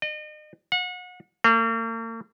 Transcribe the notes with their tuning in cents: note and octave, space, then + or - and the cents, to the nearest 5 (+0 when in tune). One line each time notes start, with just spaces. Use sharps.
D#5 -40
F#5 -35
A#3 -45